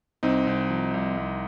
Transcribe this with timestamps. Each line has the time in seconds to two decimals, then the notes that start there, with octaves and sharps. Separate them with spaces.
0.23 C2 C4 D#4
0.47 C2
0.70 F3
0.94 C2
1.17 C2